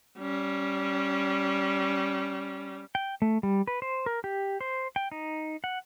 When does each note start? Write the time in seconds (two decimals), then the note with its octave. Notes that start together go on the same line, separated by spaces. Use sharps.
0.19 G3 C#4
2.95 G5
3.22 A3
3.43 G3
3.67 B4
3.82 C5
4.06 A#4
4.24 G4
4.61 C5
4.96 G5
5.12 D#4
5.64 F#5